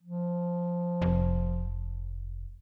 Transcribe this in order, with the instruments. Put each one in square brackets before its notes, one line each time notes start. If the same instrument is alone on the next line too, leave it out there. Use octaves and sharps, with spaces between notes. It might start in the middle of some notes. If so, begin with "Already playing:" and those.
[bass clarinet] F3
[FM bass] F1